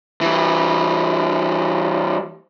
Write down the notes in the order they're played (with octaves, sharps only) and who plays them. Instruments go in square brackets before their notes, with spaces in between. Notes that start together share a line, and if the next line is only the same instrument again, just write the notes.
[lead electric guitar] E3 G3